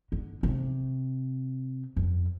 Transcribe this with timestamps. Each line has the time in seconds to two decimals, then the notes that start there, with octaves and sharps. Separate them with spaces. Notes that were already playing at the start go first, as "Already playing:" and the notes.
0.12 D3
0.43 C3
1.96 F2